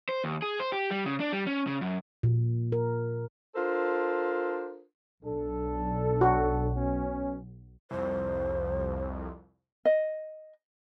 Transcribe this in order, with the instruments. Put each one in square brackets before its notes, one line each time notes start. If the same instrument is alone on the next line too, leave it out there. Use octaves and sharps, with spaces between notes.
[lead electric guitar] C5
D#2
G#4
C5
G4
G3
C#3
D4
G3
C#4
C#3
F#2
[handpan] A#2
A#4
[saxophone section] D4 F4 A4 A#4 C5
[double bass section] B1 [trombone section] D4 A4
[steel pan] F#4
[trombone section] B2 C#4
[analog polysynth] C2 F2 [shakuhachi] C5
[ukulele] D#5